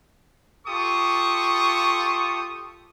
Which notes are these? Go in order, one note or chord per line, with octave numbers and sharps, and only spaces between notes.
F4 G4 A4 C#6 D#6